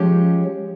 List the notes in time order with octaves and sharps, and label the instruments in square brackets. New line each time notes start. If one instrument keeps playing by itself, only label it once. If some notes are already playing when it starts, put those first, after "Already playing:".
Already playing: [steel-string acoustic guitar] F3 G#3 C#4 G4